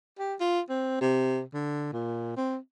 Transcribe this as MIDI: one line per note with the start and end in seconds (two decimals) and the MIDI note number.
0.19 0.35 67
0.40 0.60 65
0.69 1.00 60
1.01 1.42 48
1.53 1.92 50
1.93 2.37 46
2.37 2.57 60